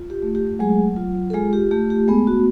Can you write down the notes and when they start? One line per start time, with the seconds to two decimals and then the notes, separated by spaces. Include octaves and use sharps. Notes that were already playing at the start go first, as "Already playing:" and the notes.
Already playing: F4
0.10 G4
0.23 A3
0.35 G4
0.59 F#3 G#3 G#4
0.97 F4
1.30 A4
1.34 G#3 F4 G#4
1.53 G4
1.71 A3 G4
1.90 G4
2.08 G#3 B3 G#4
2.27 F#4